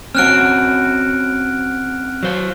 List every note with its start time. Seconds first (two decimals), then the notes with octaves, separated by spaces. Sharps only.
0.15 C4 C#4 F#4 F6 F#6 D7
2.23 F#3 C5